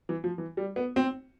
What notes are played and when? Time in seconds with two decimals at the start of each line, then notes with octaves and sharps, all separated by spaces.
0.09 E3
0.24 F3
0.38 E3
0.57 G3
0.76 B3
0.96 C4